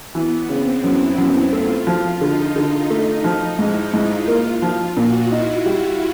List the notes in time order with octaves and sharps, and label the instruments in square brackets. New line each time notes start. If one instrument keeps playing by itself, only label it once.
[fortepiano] E3 [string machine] B3
[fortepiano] C#3 [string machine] C4
[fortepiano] F#2 [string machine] E4
[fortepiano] F#2
[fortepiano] A3 [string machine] F4
[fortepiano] F3
[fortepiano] D3 [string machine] D#4
[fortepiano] D3
A3
F3
[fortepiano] G#2 [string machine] E4
[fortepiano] G#2 [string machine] F4
[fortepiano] A#3
F3
[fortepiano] A#2 [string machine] F#4
[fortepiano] D#4 [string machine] E4
[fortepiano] G3